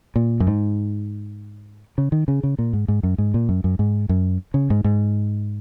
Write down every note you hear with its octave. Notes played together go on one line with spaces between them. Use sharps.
A#2
F#2
G#2
C#3
D#3
C#3
C#3
A#2
G#2
G#2
F#2
G#2
A#2
F#2
F#2
G#2
F#2
C#3
G#2
G#2